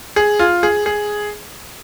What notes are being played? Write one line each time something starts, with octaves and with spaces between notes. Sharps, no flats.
G#4
F4
G#4
G#4